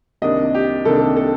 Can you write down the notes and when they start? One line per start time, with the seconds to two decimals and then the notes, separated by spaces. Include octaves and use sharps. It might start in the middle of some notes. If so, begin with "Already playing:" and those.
0.22 C2 C3 D#3 A#3 D4 D#5
0.55 G4
0.85 C2 C3 D#3 A#3 D4 A4
1.17 A4